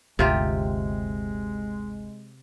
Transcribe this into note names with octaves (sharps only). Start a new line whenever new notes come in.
G1 D2 C3 G#3 F4 G4